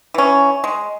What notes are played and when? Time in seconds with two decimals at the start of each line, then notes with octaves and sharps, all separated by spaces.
0.14 E3 C#4
0.64 G#3